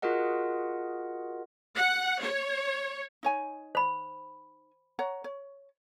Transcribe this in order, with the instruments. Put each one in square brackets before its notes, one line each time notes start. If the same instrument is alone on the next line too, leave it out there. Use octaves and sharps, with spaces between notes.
[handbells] F4 F#4 G#4 A#4 D#5 F#5
[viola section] F#5
C#5
[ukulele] D#4 C#5 G#5
[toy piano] C5 B5
[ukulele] C#5 F#5 A#5
C#5